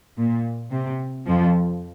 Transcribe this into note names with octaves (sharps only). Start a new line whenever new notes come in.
A#2
C3
F2 F3